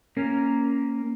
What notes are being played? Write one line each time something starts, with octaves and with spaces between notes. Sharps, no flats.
A#3 C#4 A#4